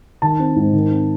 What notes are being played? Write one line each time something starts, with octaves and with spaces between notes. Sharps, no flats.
D#3 A5
C4
G#2
D#3
C4